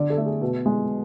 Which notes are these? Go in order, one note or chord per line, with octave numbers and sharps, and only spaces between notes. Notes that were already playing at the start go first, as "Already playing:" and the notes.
Already playing: D3 D5
A4
A3
G#4
B2
G#3